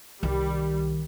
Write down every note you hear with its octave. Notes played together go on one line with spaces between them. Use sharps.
C2 D#3 G3